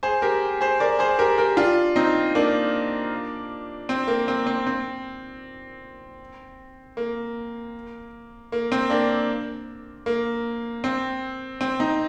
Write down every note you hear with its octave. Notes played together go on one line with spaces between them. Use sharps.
G#4 C5
G4 A#4
G#4 C5
A#4 D5
G#4 C5
G4 A#4
G4 A#4
D4 F4
C4 D#4
A#3 D4
C4
A#3
C4
C4
C4
A#3
A#3
C4
A#3 D4
A#3
C4
C4
C4 D#4